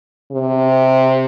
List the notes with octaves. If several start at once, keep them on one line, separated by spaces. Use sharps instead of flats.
C3